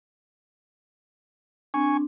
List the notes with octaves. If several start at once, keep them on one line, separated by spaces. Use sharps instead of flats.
C4 D4 G#5 C#6